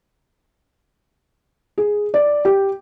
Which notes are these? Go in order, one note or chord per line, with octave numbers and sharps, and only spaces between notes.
G#4
D5
G4